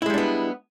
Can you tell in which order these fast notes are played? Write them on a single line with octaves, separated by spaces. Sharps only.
E4 G#3 G3 D4 B3